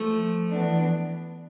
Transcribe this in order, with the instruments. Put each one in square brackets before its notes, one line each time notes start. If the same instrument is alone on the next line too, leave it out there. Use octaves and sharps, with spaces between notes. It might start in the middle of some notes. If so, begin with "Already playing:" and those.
Already playing: [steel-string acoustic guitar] F3 A3
[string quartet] E3 B3 D4